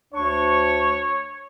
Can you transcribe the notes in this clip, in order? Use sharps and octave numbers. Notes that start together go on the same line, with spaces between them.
D2 D4 C#5 C#6